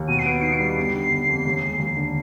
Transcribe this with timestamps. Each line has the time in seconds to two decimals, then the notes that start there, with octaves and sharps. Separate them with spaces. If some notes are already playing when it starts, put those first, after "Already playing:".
Already playing: D#2
0.08 B2 D#7
0.19 C7
0.25 B3 D7
0.42 D#4 C7
0.53 D7
0.59 G3 C7
0.77 G1
0.94 D3
1.11 G1
1.28 F2
1.45 D#2
1.62 G#3
1.79 D#2
1.97 D3